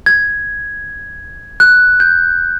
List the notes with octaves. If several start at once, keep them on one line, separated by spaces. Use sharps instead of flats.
G#6
F#6
G6